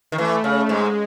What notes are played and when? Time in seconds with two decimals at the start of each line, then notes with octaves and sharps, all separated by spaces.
0.12 D#3
0.18 E3 A3
0.44 C#3
0.69 G#2 G#3